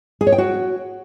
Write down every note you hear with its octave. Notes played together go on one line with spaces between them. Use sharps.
G#4
C#5
G5
F#4